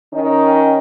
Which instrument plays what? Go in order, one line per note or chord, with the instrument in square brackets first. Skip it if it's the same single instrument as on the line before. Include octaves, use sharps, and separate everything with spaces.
[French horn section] D#3 C#4 D#4